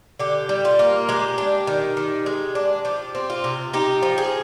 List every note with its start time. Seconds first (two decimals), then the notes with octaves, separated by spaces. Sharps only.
0.19 D3 G4
0.49 G3
0.65 F4
0.79 A#3
1.09 G#3 G4
1.38 D4
1.67 D#3
1.97 D#3
2.26 G#3
2.55 D4
2.85 F3 G4
3.15 C4
3.30 F4
3.44 C3
3.73 D#4 G4
4.02 F3
4.18 G#4